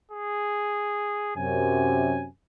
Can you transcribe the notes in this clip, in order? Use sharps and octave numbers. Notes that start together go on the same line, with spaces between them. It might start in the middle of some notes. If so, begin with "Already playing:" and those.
G#4
F#2 C3 G#5